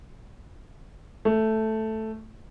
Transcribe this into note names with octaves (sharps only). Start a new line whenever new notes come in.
A3